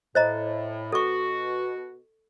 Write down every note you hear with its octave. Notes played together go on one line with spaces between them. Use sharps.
A2 C5 D#5 A#5
B2 F#4 A4 C#6